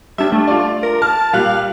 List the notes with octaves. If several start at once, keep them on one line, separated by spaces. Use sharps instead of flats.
G3 D4 E5
A3
F4 D5
A#4
A5 F6
A#2 G3 F5 F#6